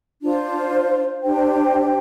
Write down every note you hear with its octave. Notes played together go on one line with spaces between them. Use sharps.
D4 F4 C5
D4 G4 C5 G5